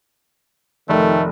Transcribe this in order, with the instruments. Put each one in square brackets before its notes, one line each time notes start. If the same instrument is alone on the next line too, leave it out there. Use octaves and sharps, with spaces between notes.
[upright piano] F1 [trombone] D#3 [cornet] A3